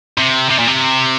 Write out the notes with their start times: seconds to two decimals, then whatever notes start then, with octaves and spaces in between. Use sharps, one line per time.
0.18 C3
0.50 C3
0.59 A#2
0.68 C3